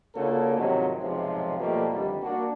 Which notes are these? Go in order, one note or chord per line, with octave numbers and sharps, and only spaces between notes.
C#3 A#3 D4 F4 F#4 A4
G#2 C3 D#3 F3 F#3
B1 G#2 C3 F3
B2 F3 G3 A3 A#3
F2 D3 D#3 G3
A#3 D4 F#4